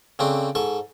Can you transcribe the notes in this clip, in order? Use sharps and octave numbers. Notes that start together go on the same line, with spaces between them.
C#3 A3 C4 D4
G#2 A4 C#6